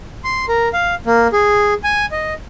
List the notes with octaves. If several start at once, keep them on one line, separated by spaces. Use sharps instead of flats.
C6
A#4
F5
A#3
G#4
G#5
D#5